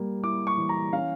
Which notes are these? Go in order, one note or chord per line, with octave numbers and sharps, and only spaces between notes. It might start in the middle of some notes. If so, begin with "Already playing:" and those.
Already playing: G3 A#3
E4 D6
C#6
E3
A#5
C#4 F5